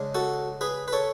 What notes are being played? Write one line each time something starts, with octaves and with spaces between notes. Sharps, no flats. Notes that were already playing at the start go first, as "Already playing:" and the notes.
Already playing: C#3 G#3 D4
F#4 A4
G#4 B4
B4
A4 C#5